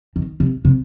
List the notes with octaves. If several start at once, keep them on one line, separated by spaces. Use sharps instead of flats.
D#3
C3
C3